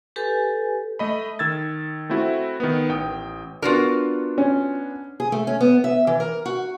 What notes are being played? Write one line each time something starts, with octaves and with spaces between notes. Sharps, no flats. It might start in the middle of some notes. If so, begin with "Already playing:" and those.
G4 A4 B4 G#5
A3 D#5 B5
D#3 E6 G#6 A6
A3 C4 E4 F#4
D#3 B3
A1 G5 D#6
B3 D4 F4 F#4 A#4
C#4
G#4
A3
C#4
B3
E5
E3
A#4
F#4